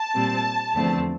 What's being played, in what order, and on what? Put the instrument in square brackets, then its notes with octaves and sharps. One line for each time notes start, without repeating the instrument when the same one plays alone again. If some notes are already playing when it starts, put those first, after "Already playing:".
Already playing: [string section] A5
A#2 G3 C4
E2 D3 F3 A3 C4